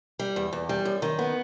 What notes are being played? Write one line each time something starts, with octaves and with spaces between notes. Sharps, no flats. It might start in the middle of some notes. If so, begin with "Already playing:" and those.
G3
E2
E2
G3
F#2
D#3
B3